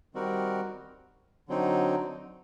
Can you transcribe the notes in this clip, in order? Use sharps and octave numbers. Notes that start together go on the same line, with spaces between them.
D#3 G3 C4 F#4 A#4
D3 F#3 C4 D#4